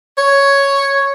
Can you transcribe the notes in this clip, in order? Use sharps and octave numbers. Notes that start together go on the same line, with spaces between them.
C#5